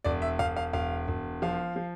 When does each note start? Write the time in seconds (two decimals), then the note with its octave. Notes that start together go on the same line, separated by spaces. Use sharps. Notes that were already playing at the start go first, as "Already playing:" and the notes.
0.04 E1 D5
0.22 E5
0.39 E1 F5
0.57 F5
0.73 E1 F5
1.08 E1
1.42 F3 F5
1.76 F3